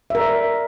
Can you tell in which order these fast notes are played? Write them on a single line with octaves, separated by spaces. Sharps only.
E5 A#4 D5